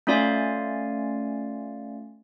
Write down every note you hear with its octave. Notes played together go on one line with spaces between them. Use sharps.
A3 C#4 F4 D5 F5 G#5